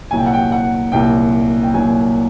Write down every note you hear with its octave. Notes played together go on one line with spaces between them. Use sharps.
C2 A#2 F#3 G#5
G5
F#5
G5
F#5
C2 A#2 F#3 G5
G5
C2 A#2 F#3 G#5